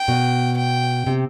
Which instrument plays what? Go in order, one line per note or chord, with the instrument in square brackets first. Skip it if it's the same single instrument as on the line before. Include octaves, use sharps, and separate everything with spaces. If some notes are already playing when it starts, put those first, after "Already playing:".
Already playing: [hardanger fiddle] G5
[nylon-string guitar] B2
[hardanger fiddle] G5
[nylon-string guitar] C3